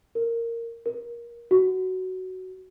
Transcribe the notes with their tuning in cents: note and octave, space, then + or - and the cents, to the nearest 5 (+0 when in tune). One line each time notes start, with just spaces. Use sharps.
A#4 -10
A#4 +20
F#4 +10